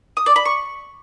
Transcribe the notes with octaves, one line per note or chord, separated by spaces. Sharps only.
D#6
D5
B5
C#6